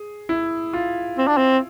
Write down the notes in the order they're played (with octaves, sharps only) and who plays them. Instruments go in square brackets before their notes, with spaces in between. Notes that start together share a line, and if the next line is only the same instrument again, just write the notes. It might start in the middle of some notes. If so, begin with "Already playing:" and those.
Already playing: [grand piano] G#4
E4
F4
[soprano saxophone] C4
D4
C4